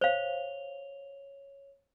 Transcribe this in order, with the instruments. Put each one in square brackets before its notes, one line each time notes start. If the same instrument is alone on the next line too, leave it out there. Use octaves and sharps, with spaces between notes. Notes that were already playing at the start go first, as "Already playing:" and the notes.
[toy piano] C5 F5 [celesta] C#5 F7 G7